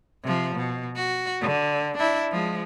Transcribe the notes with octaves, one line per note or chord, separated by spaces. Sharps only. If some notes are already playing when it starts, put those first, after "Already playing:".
C3 F3
B2
F#4
D3
D4 E4
F3 G#3